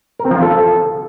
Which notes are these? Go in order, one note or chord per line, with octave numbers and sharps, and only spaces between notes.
A#4
C4
F3
F4
A4